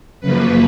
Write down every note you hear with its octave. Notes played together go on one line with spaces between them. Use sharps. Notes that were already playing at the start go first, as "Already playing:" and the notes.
F#2 C#3 F3 A#3 B4